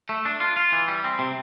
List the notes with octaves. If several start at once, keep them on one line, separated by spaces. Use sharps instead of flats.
A3
D4
F4
F4
E3
G3
C4
C3